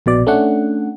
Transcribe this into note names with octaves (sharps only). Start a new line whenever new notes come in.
A#1 B2 D5
A3 C#4 D4 F#5